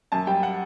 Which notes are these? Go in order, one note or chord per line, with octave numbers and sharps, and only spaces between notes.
F#2 A5
G3 G5
F#5